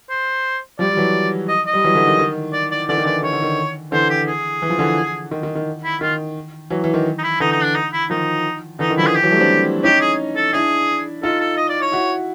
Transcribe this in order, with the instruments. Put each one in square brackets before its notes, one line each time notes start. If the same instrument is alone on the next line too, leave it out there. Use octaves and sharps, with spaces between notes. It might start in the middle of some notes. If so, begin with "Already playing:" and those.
[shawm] C5
[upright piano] F3 G3 [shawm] D5
[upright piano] G3
E3 F#3
[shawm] D#5
D#5
[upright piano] G3
E3 F#3
D3 E3
D#3
D#3
[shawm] D5
D5
[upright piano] D3 E3 [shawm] D5
[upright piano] D#3
[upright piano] D3 E3 [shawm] D5
[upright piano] D#3 [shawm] C#5
[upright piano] D3
D#3
[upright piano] D3 E3 [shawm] C5
[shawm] G4
G#4
[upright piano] E3
F3
D3 E3
D#3
D#3
D#3
[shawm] E4
[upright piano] D#3 [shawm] F4
[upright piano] E3 F#3
E3
D#3
[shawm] D#4
E4
[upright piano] D3 E3 [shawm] D#4
[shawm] D#4
D4
D#4
E4
[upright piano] D#3 F3 [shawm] D#4
[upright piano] D3 E3 [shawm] D#4
[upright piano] D#3
[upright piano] F3 [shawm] E4
[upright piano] D3 E3
[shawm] G#4
G4
[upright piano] E3 F#3
G3 A3
C4 D4
[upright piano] C#4 D#4 [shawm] G4
[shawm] G#4
A4
[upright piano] D4 E4 [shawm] G#4
[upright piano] D#4 F4 [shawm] A4
[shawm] A4
D#5
D5
C#5
[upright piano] E4 F#4